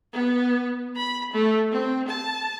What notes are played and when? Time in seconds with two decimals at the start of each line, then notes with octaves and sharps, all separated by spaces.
0.13 B3
0.96 B5
1.33 A3
1.72 C4
2.08 A5